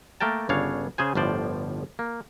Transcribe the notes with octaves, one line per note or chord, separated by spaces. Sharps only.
A3 A#3 A#4 G5 A5
G1 C#3 D4 C#5 F5
C#3 G#4 C5 G#5
G1 A2 F3 C5 D5
A#3